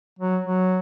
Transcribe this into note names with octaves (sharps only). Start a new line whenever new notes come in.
F#3
F#3